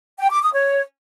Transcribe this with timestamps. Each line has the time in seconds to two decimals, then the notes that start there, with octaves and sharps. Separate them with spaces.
0.19 G5
0.30 D6
0.42 D#6
0.53 C#5